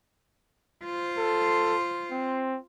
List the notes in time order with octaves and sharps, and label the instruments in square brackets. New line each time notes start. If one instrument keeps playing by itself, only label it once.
[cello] F4 C5
[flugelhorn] A4
C4